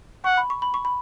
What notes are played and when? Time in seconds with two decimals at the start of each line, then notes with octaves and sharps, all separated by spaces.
0.24 F#5 C#6
0.37 B5
0.50 C#6
0.62 B5
0.74 C#6
0.85 B5